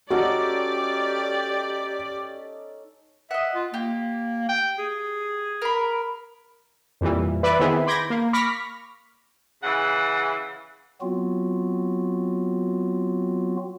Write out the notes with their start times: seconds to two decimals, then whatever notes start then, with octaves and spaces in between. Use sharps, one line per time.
0.10 C#4 D#4 F#4 G4 A4 D5
3.31 D#5 E5 F#5
3.55 F4
3.74 A#3 G4
4.49 G5
4.79 G#4
5.62 A#4 B5
7.01 F2 A#2 E3 G3
7.43 B4 D5 E5 B5 D6
7.59 D#3 B3 C4 E4 G#4
7.86 B5 C6 D6 G6 G#6 A#6
8.10 A#3
8.33 B5 C#6 D6 F6 A#6 B6
9.63 C#3 E3 F#5
11.01 F#3 B3 C4 F4 F#4